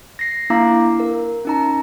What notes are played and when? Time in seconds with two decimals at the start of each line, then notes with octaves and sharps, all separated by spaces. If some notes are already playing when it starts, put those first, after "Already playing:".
0.19 A#6 C7
0.50 A#3 D4 E4 F5 A#5 D6
1.00 A#4
1.45 C#4 D#4 A#5